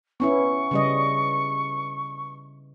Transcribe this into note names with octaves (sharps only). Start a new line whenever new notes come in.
B3 C#4 E4 C#6
C#3 G3 D#5